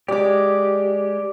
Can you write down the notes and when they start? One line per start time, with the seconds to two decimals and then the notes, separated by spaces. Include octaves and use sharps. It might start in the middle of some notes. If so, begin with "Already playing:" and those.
0.08 G#3 G4 D5 D6